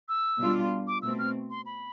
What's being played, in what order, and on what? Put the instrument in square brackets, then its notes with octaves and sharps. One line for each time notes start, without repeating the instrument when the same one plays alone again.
[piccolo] E6
[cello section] B2 G3 D4 F4
[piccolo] D6
[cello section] B2 A3 C4 [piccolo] E6
[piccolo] F6
C6
B5